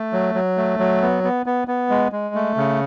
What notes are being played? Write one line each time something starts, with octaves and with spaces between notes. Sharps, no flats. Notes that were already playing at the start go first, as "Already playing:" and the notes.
Already playing: A3
F#3
F#3
A3
F#3
B3
B3
B3
B3
G#3
G#3
A3
C#3